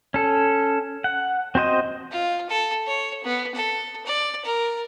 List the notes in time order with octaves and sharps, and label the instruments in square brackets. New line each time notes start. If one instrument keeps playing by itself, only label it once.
[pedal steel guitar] C#4 A4
F#5
C4 F#4 C5 D#5
[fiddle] F4
A4
C#5
B3
A4
D5
A#4